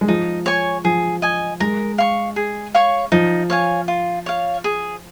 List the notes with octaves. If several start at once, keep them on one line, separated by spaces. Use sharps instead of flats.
G#3
F3 D#4
C#5 G#5 C#6
F3 G#4
D#5 G#5
G#3 A#4
F5 C#6
G#4
C#5 F5 C#6
F3 D#4
C#5 F5 G#5
F4
C#5 F5
G#4